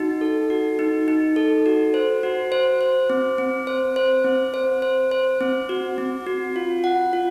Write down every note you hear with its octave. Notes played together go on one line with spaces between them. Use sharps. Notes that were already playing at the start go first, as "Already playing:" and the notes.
Already playing: D#4 F#4
A4
F#4
D#4
D#4
A4
F#4
C5
F#4
C5
C5
C4
C4
C5
C5
C4
C5
C5
C5
C4
F#4
C4
F#4
F4
F#5
F4